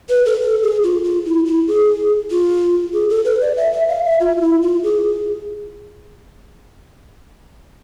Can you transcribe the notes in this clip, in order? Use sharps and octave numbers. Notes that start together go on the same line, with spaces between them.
B4
A4
A4
G#4
F4
F4
E4
E4
G#4
F4
G#4
A4
B4
D5
E5
E5
F5
E5
F4
F4
E4
F4
G#4